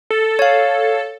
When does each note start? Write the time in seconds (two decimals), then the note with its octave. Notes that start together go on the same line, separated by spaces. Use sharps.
0.10 A4
0.39 C#5 F5